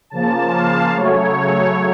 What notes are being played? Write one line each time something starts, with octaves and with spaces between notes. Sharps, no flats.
C#3 F3 A#3 A5
F5
C#3 F#3 A3 C#5